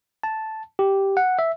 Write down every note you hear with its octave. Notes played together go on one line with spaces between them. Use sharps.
A5
G4
F#5
E5